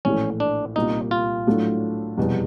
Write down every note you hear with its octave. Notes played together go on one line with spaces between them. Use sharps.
A#1 A2 E3 A3 C#4
D4
C2 A#2 G3 A#3 D#4
F4
A2 F#3 A3 D4
F1 E2 B2 G3 B3